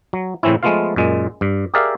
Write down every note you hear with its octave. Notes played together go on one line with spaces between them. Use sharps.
F#3
A2 C#3 E3 C4 C#4 E4
F3 G#3 A3 B3 F4 F5
F#2 A#2 G#3
G2
G4 G#4 A#4 D5 E5 F5